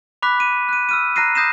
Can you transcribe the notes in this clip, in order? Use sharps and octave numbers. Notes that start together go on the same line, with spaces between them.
B5 D6 F#6 B6
D#7
F#6 D#7
E6 F6 D#7
A#5 F#6 A#6 C7 D#7
D#6 G6 A#6 C7 E7